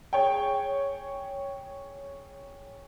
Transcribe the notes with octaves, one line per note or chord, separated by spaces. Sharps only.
G#4 C#5 G5